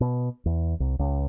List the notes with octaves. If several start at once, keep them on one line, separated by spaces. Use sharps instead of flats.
B2
E2
C2
C#2